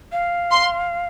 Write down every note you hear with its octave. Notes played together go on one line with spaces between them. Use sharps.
F5
C6